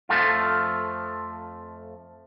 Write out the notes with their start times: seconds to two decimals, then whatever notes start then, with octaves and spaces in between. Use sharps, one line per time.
0.09 F2 G#2 F3 A3 F4